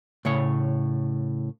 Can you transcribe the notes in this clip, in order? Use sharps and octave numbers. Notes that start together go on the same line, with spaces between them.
A2 C#3 C#5